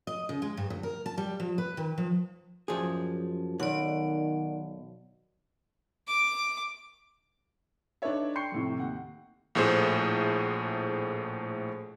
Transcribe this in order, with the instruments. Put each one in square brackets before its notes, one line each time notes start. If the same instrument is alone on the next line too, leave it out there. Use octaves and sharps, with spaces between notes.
[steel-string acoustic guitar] D#5
C#3
G#3
G2
D2
A#4
A5
G3
F3
B4
D#3
F3
[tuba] F#2 [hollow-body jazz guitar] F3 G#4
[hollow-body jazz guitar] B1 [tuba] D#3 [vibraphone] D5 F#5
[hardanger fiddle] D6
[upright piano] D4 D#4 A4 B4 C#5 E5
G5 C6 C#6 G6 C7 C#7
F2 A2 C3
D#2 F#5
[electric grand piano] A#1 A2 A3 G#4 C5